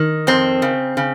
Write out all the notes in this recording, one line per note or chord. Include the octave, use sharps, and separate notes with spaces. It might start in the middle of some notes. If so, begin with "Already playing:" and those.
Already playing: D#3
F2 C4
C#3
C#3